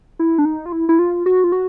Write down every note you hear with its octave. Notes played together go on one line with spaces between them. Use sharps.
E4
D4
D#4
F4
E4
E4
F4
F#4
F4
F#4